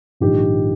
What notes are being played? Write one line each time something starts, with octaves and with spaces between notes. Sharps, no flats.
A#1 G#2 D#3 G4